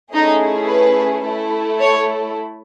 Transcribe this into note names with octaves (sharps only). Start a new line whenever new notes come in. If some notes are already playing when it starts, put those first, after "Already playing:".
A3 C#4 D#4 E4 G#4 D#5
B4
A3 E4 A4
C#5